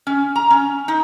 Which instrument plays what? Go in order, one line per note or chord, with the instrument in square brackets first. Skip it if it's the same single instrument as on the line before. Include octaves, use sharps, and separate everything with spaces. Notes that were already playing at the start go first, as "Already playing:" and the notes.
[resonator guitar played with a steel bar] C#4
A#5
C#4
D#4